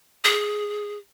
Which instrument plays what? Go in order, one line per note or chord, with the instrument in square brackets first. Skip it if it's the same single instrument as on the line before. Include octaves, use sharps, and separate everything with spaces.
[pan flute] G#4